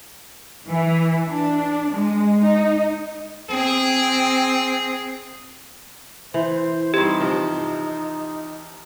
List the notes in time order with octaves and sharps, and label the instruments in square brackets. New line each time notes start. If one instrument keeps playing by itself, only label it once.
[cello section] E3
D4
G#3
D#4
[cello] C4 [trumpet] G#4
[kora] E3 [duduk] C5
[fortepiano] G2 C4 [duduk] D#4 [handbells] G4
[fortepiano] C3 F3